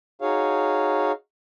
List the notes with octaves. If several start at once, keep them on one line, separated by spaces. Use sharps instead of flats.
D#4 F#4 G#4 C#5 F5